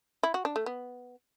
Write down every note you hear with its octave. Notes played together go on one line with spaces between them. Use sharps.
E4
F#4
D4
A3
B3